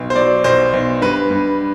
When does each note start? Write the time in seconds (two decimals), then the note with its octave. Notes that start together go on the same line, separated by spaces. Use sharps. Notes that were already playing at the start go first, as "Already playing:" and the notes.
Already playing: B1
0.10 C5
0.16 F#3 D5
0.44 B1 C5
0.73 B1
1.01 G2 B4
1.30 G2